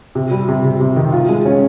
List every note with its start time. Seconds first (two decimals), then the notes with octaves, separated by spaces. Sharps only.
0.15 C3
0.31 G3
0.49 C3
0.64 C3
0.81 C3
0.96 D#3
1.12 F4
1.29 G#3
1.46 C#4